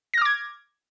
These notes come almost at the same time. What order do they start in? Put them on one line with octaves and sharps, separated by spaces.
A#6 F6 D6 G#6